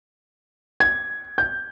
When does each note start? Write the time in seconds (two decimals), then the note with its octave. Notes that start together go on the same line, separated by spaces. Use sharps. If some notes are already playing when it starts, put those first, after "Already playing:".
0.80 G#6
1.38 G6